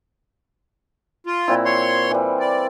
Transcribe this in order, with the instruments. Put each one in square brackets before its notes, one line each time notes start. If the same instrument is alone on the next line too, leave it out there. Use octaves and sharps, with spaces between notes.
[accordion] F4
[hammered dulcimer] A#2 C4 E4
[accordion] C#5 C6
[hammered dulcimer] E3 G3
[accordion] D5